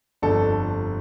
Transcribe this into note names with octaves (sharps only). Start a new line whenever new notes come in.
G1 F2 D3 A4